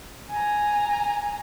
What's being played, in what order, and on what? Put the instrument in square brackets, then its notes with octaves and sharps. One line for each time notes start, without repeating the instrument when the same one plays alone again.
[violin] G#5 A#5